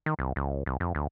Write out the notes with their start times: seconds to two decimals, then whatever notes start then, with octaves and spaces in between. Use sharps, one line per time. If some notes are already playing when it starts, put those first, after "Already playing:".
0.06 D#3
0.19 C2
0.36 C#2
0.66 C2
0.80 F2
0.95 D2